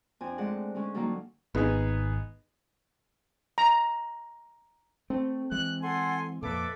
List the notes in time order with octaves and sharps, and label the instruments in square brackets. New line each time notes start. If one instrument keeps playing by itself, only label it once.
[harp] F2 C4 D4 G#5
G#3 A3 D5 F#5
D3 G#3 C#4
D3 F#3 G3 A#3 D#4
[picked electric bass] G#1 [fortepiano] B3 D#4 G#4
[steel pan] A#5
[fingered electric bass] A3 [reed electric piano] C4
[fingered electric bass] E3 G#3 [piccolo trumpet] F#6
[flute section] A4 F#5 C6 [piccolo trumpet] G#5
[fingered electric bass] F2 A#2 [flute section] A4 B4 E5 [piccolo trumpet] D6